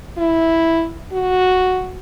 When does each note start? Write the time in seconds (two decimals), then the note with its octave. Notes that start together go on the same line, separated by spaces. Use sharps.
0.17 E4
1.12 F#4